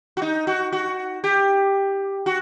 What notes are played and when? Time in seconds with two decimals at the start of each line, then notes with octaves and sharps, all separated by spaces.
0.17 F#4
0.22 D#4
0.47 F#4
0.72 F#4
1.24 G4
2.26 F#4